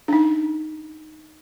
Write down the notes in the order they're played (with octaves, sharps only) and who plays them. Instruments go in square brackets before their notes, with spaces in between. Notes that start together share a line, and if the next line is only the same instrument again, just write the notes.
[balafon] D4 D#4